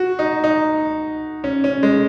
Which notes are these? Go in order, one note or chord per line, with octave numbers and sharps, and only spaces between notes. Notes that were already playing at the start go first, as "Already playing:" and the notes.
Already playing: F#4
D#4
D#4
C#4
C#4
G#3